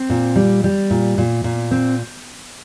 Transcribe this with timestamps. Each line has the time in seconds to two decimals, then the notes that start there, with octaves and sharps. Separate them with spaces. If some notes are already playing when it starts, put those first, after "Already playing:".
Already playing: C4
0.10 A#2
0.36 G3
0.64 G3
0.91 A#2
1.18 A#2
1.44 A#2
1.71 C4